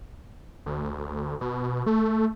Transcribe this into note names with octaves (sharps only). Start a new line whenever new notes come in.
D2
B2
A3